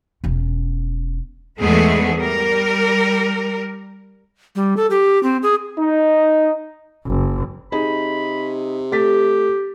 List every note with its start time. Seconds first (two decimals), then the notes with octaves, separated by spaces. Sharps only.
0.24 E1 C#4
1.59 E2 G#2 G#3 A3 B3 G#4
2.16 G3 A#4
4.56 G3
4.77 A4
4.90 G4
5.23 C4
5.43 G#4
5.79 D#4
7.06 F#1
7.72 C3 D#4 G#4 D#5 B5
8.92 A3 G4 A6 B6